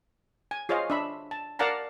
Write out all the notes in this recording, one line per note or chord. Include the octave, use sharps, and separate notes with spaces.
G#5
F4 G#4 C5 C#5 D#5 F5
D4 E5 B5
A5
A#4 D5 F5 F#5 A5 A#5